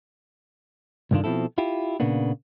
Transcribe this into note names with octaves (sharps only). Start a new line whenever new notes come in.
C2 G2 D3 D#3 D4 F4
B2 F3 C4 E4 A4
E4 F4 G4
A#2 C#3 A#3 B3 D4